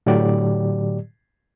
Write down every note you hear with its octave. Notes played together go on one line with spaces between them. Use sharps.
A2 D3 F#3 G4 D5